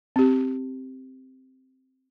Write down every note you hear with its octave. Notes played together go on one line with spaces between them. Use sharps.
C4 G4